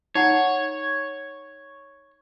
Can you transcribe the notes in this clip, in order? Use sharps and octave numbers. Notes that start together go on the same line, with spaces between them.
D#4 C#5 F#5 A#5